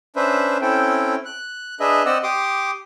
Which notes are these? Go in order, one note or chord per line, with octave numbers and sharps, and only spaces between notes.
C#4 D4 B4 C5 E5
C4 C#4 E4 A4 G5
F#6
D4 G#4 B4 D#5 E5
C4 D5 D#5 F#5 E6
G4 C6 D6 D#6